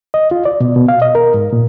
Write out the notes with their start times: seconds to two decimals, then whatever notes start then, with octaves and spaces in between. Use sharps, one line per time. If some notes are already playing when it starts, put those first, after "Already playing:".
0.14 D#5
0.31 F4
0.45 D5
0.61 B2
0.76 B2
0.88 F5
1.02 D#5
1.15 A#4
1.34 G#2
1.53 A#2